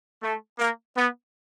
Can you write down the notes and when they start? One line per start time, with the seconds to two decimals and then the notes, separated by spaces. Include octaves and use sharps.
0.23 A3
0.59 A#3
0.97 B3